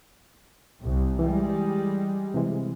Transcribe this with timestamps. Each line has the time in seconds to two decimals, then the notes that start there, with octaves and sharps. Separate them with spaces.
0.80 C2
1.19 E3 G3 G#3
2.34 C3 E3 G#3